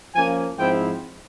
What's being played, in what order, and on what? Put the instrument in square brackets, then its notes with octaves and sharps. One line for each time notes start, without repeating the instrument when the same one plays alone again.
[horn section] F3 A#3 C#4 G#5
G#2 F3 C4 E4 G5